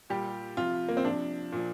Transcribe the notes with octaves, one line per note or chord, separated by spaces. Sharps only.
A#2 G3 G4
C3 F3 F4
A#3
C4
C3 F3 D4
A#2 F3